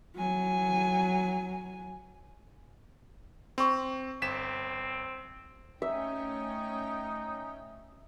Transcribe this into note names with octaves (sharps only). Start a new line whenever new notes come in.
F#3 G#5
C4 C6 C#6
G1 C4 B6 E7
A3 C#4 D#4 E5 G5